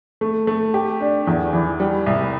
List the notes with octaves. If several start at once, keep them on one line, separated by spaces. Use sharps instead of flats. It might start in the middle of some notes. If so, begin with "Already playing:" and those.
A3
A3
G4
D4
E2
E3
G3
C2